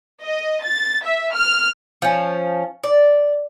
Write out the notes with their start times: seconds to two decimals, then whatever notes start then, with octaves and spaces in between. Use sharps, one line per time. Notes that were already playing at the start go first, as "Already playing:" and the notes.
0.22 D#5
0.64 A6
1.04 E5
1.34 F6
2.02 F3 C#4
2.84 D5